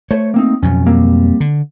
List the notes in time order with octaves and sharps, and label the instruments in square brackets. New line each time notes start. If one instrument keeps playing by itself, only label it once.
[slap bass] A3 [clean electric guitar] C5 C#5
[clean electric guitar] A#3 C4 D#4
[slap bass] F2 B2 F#3 [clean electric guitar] C#4
[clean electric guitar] G3 A#3 C4
[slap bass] D3